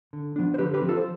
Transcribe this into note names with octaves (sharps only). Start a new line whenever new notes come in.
D3
F3 B3 D4
C5
D3 G4 B4
G4 B4
F3 C4
F4 A4
C5